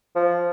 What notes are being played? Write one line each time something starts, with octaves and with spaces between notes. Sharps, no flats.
F3